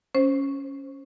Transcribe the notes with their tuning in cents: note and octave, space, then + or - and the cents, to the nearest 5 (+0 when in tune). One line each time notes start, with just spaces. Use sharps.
C#4 +0 C5 +10